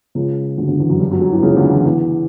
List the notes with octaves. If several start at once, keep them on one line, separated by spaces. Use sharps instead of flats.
C#2 C#3
D2 D3
D2 D3
E2 E3
F#2 F#3
G2 G3
F#2 F#3
F#2 F#3
E2 E3
C#2 C#3
D2 D3
E2 E3
E2 E3